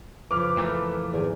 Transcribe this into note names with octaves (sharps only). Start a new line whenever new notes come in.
F2 C#3 F3 B4 D6 F6
A#2 E3 A3
E2 G#2 D#3 G#5